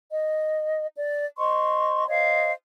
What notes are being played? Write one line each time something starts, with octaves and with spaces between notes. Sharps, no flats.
D#5
D5
C5 D#5 C6 C#6
C5 C#5 D#5 F5